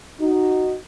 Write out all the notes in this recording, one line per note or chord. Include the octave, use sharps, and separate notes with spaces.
D#4 F#4